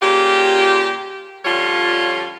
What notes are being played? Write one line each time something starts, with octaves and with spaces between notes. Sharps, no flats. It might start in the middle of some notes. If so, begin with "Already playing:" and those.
A#2 C#3 F4 G4
D3 F3 G3 C#4 F4 C#5